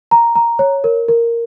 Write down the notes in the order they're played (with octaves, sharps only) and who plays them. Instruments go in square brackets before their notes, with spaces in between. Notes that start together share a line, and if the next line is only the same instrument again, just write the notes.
[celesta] A#5
A#5
C#5
A#4
A#4